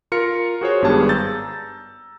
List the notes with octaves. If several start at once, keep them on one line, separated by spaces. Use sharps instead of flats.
F4 A#4 F6 C#7
F#4 G#4 C5 C#5
G#1 G2 B3 G4 G#4 A5
A#5 E6 G6 A6